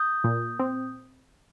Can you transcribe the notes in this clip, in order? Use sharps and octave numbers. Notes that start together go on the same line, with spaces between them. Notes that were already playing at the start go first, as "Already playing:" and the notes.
Already playing: D#6 G6
A#2
C4